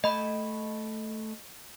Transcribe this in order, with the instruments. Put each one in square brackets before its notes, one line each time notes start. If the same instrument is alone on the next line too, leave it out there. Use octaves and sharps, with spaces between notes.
[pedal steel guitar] A3 G5 [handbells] D#5 B5